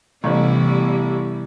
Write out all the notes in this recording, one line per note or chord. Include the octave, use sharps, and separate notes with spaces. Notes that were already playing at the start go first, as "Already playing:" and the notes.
A1 C3 E3 G3 B3 E4